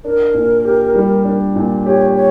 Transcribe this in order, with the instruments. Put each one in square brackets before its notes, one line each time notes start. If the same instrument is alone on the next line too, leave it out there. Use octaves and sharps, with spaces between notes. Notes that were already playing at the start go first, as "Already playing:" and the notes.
[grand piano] D4 [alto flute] A#4
[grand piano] A#2
G4
G3
D4
A#2
[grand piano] G4 [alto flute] C#5
[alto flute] C#5